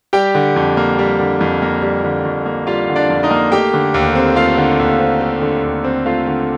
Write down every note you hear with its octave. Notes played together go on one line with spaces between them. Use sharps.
G3 G4 G5
D3
F2
A#3
G3
D3
F2
A#3
G3
D3
F2
A#3
G3 F4 F5
D3
D4 D5
F2
D#4 D#5
A#3
A3 G4 G5
D3
D#2
C4
A3 F4 F5
D3
D#2
C4
A3
D3
D#2
C4
A3 F4 F5
D3